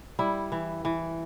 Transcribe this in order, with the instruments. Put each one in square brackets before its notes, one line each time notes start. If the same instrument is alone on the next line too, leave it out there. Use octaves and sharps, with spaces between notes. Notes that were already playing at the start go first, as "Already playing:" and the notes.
[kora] G3 E4
E3
E3